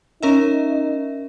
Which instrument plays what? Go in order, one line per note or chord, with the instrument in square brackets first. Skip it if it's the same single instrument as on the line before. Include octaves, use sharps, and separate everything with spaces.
[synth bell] C#4 A#4 E5 [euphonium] D#4